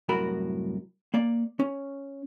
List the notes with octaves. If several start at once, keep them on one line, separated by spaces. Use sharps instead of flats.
C2 F#2 A2 F#4 A#4 B5
A#3 D5
C#4